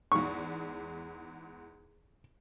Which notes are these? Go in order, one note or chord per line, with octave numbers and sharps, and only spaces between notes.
E2 G#2 C#6